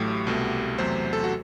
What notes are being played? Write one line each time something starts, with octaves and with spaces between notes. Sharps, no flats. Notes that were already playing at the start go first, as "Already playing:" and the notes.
Already playing: A1 A2 F#3 A3 G4
C2 B2 A3
E2 C3 F#3 A3 C5
A4
F#4